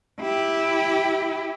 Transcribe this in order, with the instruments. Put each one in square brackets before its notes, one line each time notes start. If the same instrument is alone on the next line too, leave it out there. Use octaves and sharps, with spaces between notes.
[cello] E4 G4